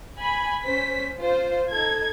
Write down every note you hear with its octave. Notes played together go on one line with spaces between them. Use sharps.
G#5 B5
C#4 C5 B6
F4 C5
D#4 A4 G#6